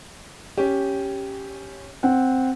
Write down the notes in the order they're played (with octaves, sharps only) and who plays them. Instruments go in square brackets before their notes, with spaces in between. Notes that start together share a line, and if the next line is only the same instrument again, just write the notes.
[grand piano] C#4 G4
[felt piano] C4 F#5